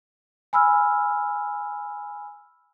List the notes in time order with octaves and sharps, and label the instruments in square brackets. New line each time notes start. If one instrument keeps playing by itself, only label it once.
[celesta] G#5 B5 E6 F6